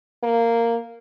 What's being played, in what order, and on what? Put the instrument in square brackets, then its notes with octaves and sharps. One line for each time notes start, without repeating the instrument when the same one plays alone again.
[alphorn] A#3